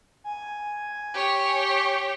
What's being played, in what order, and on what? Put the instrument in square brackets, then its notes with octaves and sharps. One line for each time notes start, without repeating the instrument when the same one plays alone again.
[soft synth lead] G#5
[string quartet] G4 C#5